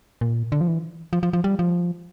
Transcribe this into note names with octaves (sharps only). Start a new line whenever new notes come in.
A#2
D3
F3
E3
F3
F3
F3
G3
F3